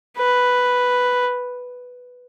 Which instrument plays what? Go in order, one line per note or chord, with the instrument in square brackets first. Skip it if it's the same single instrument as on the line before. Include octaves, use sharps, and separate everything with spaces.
[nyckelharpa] B4